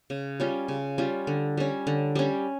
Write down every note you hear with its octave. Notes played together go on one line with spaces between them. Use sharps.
C#3
G3 C#4 F4
C#3
G3 C#4 F4
D3
G3 C#4
D3
G3 C#4